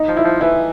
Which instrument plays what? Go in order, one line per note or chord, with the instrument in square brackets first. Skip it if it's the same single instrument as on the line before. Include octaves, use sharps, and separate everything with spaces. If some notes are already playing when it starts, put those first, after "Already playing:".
Already playing: [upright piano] D#4
[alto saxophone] F3
[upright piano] E4
[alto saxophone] F3
[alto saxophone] E3 [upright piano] E4